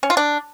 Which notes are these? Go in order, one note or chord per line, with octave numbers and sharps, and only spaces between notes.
C#4
F4
D4